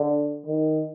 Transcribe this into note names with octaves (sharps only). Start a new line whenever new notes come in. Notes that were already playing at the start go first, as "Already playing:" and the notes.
Already playing: D3
D#3